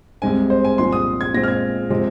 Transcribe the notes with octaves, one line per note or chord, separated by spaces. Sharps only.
C2 C3 G#3 C4 G#5
C5
G#5
C2 A#2 F3 C4 C6
D#6
G#6
A#2 G#3 C4 A#6
F6
G#6
C3 F3 G#3 C4